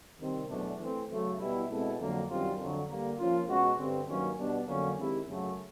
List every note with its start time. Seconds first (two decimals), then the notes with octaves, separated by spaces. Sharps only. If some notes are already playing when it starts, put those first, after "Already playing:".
0.20 C3 D#3 G3 C4
0.50 E2 B2 F#3 A3 D4
0.79 E3 A3 C4
1.09 C#3 F#3 A3
1.39 B2 G3 B3 E4
1.69 B2 G#3 C4 E4 A4
1.99 F2 D3 F#3 A#3
2.29 F#2 D#3 G3 C4 F4
2.58 F2 D3 F#3
2.88 D3 G3 A#3
3.18 F3 A#3 C#4 F4
3.47 B2 G#3 C#4 F#4
3.78 G2 D3 G3 C4
4.07 G2 D#3 F#3 A#3 C#4
4.37 B2 G3 B3 D4
4.67 F2 D3 F#3 A#3 C#4
4.97 D#3 G#3 C4 E4 G4
5.27 F#2 C#3 F#3 A3